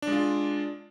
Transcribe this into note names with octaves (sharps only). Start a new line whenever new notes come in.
G#3 D4 F4